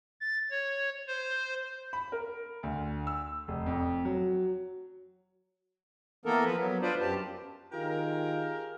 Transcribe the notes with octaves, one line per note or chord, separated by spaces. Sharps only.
A6
C#5
C5
B5
A#4
D2
E6
F1
F2
F#3
E3 A#3 B3 A4 A#4
F3 B4
F#3 B3
D4 F4 B4 C5 D5
F#2 G4 A5
D#3 F4 G4 G#4 A#4